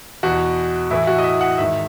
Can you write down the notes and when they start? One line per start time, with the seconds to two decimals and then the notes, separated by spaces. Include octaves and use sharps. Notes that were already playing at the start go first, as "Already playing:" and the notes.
0.23 E2 B2 F#4
0.91 A2 E3 E4
1.07 F#4
1.18 D#5
1.24 E5
1.41 F#5
1.58 G#2 D#3 E5